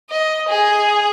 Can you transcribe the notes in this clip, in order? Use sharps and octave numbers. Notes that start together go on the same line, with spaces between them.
D#5
G#4